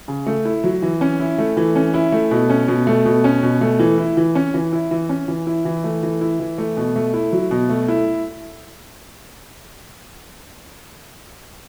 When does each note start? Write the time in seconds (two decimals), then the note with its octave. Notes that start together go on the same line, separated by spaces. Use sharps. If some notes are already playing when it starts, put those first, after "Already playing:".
0.08 C#3
0.26 A3
0.45 E4
0.64 F#3
0.82 E3
1.01 C#4
1.20 E4
1.38 A3
1.57 E3
1.76 C#4
1.94 E4
2.12 A3
2.31 B2
2.50 C#4
2.68 B2
2.87 A3
3.05 B2
3.24 C#4
3.43 B2
3.61 A3
3.79 E3
3.98 E4
4.17 E3
4.35 C#4
4.54 E3
4.73 E4
4.91 E3
5.09 C#4
5.28 E3
5.47 E4
5.65 E3
5.84 A3
6.03 E3
6.21 E4
6.40 E3
6.58 A3
6.77 B2
6.96 A3
7.14 E4
7.32 F#3
7.51 B2
7.69 A3
7.88 E4